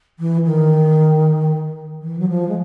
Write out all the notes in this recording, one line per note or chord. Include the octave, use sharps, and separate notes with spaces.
E3
D#3
E3
F#3
F3
G#3